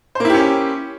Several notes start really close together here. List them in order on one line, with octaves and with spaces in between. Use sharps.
C5 A#3 E4 G4 C#4